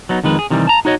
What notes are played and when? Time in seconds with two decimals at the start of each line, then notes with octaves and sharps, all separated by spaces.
0.09 F#3 B3 D#4
0.24 F2 D#3 G#3 B4
0.39 G#4
0.50 C3 D#3 E3 G3
0.67 A5 A#5
0.85 D#4 F#4 C#5 D#5